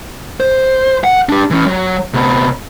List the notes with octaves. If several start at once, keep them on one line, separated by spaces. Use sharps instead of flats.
C5
F#5
D4 G4
E3 C#4
F#3
C3 B3